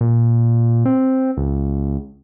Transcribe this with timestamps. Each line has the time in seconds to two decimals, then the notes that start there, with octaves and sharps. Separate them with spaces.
0.01 A#2
0.85 C4
1.37 C#2